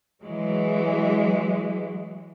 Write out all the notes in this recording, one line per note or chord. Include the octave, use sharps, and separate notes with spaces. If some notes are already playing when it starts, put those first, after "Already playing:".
E3 F#3 G#3